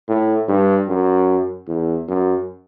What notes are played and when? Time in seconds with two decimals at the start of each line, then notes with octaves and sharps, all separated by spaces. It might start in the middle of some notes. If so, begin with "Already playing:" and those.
0.08 A2
0.48 G2
0.88 F#2
1.68 E2
2.08 F#2